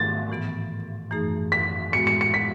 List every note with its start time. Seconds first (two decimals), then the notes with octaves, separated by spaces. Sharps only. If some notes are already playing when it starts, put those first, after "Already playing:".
Already playing: G#2 D#3 A3 A6
0.30 A2 E3 B3
1.11 F#2 E3 A3 D#4 G#4
1.52 B6
1.93 A2 G#3 B3 F#4 C#7
2.07 C#7
2.21 C#7
2.34 B6